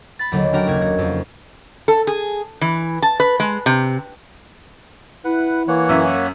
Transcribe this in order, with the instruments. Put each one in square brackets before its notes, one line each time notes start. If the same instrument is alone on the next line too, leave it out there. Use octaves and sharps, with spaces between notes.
[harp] B5 A6
D#2 D3 F#3
C#4 D4 F#4 A#4 G5 A#5
F#1 D#2 G#6
F#4
F2
[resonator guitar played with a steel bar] A4
G#4
E3
A5
B4
G#3
C3
[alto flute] E4 [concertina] B4 F#5
[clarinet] E3 [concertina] A#3 C#5 F#5
[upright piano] F#2 C#4 E5